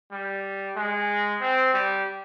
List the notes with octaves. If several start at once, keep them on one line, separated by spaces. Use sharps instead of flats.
G3
G#3
C4
G3